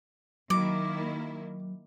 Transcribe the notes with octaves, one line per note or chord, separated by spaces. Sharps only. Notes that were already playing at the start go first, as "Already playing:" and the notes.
D#3 F#3 A#3 E4 D6